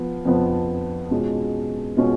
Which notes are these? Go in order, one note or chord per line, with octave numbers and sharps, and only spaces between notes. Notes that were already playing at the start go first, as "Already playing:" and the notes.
Already playing: F3 B3
F2 F3 B3
B2 G#3 C#4 F4
B2 G#3 C#4 F4